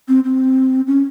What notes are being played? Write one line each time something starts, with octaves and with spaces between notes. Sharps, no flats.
C4
C4
C#4